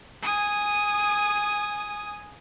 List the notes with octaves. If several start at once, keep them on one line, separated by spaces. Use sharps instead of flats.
G#5 D#6